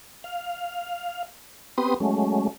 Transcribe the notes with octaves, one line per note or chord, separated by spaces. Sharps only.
F5
B3 C4 G4 B4 C6 D#6
F#3 G#3 A3 C#4